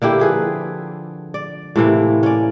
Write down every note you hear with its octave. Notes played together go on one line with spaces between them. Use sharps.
D3 A#3 E4 G4
F3 G#4 B4
D5
A2 C3 E3 A#3
C#4 D5